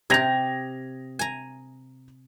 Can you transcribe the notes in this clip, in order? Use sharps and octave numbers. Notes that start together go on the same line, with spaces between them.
C3 G4 G#6 A#6 F7
G#5 A#5